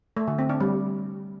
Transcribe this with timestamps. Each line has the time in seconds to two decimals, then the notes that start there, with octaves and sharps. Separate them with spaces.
0.17 A3
0.28 D3
0.38 C4
0.49 D4
0.60 G3